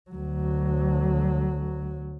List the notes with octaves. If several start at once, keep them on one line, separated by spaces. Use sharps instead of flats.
D2 F#3